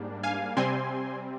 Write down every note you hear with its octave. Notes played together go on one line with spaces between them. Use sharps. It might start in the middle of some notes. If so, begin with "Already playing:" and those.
Already playing: G#2 G3 A#3 D4
F5 G#5
C3 G3 C4 G#5 C6